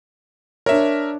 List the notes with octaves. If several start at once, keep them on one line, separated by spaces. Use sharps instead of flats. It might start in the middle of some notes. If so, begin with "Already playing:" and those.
D4 A#4 C#5 E5